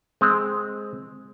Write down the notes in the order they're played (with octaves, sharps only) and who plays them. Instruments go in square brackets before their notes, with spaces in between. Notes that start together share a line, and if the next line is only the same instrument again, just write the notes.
[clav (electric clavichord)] G#3 C4